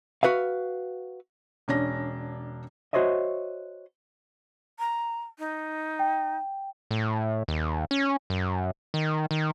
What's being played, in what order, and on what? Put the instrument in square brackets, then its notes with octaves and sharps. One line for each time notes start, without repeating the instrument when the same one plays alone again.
[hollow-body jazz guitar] F#4 B4 E5 F5
[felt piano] E1 C#4 D4 A#6
[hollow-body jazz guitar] F#4 C5 C#5 D#5 E5
[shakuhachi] A#5
D#4
[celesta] G5
[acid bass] A2
D#2
C#4
F#2
D#3
D#3